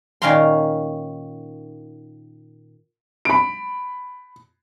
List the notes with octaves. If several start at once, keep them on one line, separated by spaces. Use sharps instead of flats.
A#2 D#3 C#4 F5 A#5 C6
B5 D7